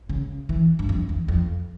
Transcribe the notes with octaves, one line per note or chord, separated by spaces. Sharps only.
C#3
E3
G2
F2
E2
F2